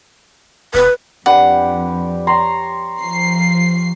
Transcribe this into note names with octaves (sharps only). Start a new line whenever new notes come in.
E1 B4
F2 D4 G4 B4 F#5
C#5 A#5 C6
F3 C7